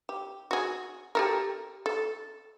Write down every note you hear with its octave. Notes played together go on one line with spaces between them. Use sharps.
G4
F#4 G#4
G4 A4 A#4
A4